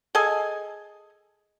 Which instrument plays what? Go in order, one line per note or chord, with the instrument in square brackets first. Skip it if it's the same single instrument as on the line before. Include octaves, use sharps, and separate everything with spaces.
[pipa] G#4 A4 D#5 G#5